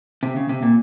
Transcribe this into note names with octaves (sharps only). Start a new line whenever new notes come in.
C3
C#3
C3
A#2